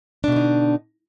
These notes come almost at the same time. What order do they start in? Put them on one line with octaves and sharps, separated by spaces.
D4 B2 D3 D#4